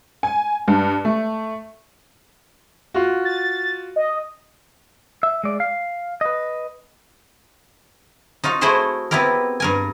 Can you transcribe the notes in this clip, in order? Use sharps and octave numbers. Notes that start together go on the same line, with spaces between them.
G#5
G2
A3
F4 F#4
A6
D#5
E5
G#3 D5
F5
B4 D#5
D#4 F4 F#4 F5
A3 E4 F#4 G#4 C5 F#5
B3 C4 E4 G4 A#4
G2 A#4 G#5